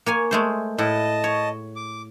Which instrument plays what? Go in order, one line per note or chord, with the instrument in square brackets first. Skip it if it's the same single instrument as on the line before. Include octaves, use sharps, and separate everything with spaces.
[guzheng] A#3 C#5 G#5
G#3 A3 C5
[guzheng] A2 E4 F#5 [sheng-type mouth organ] D#5 A5
[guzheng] C#5
[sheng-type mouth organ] D6